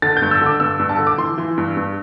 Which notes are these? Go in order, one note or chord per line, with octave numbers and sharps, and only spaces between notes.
D3 A6
G6
G2
E6
D3 D6
G2 E6
G2
A5
D3
D6
E3 C6
E3
G2
G2